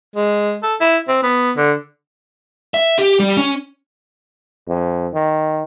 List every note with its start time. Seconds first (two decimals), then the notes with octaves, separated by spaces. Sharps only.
0.16 G#3
0.63 A4
0.81 E4
1.08 C4
1.23 B3
1.57 D3
2.74 E5
2.99 G4
3.20 G3
3.37 C#4
4.68 F2
5.14 D#3